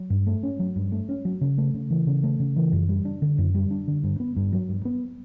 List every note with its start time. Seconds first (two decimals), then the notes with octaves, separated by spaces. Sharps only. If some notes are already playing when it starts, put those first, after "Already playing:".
Already playing: F#3
0.10 G2
0.27 A3
0.43 C#4
0.59 F#3
0.76 G2
0.92 A3
1.09 C#4
1.25 F#3
1.41 C#3
1.58 A3
1.74 C#3
1.91 E3
2.07 C#3
2.23 A3
2.40 C#3
2.56 E3
2.72 F#2
2.89 G3
3.05 D4
3.22 D3
3.38 F#2
3.54 G3
3.71 D4
3.87 D3
4.04 G2
4.20 B3
4.36 G2
4.53 F#3
4.69 G2
4.85 B3